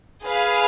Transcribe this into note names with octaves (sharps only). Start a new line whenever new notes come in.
G#4 B4 F5